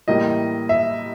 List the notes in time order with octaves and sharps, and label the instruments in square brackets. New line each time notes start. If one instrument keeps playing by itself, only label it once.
[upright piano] A2 E3 G3 A#3 D#5
E5